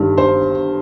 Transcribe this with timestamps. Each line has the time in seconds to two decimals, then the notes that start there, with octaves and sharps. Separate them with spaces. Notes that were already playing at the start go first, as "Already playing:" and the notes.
Already playing: G1 G2 D#3 G3
0.18 C5